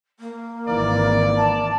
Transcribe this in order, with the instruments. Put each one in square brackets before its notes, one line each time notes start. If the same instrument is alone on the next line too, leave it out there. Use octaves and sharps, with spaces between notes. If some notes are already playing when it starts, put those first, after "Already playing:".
[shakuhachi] A#3
[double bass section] G#1 E3 [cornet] D5
[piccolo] A5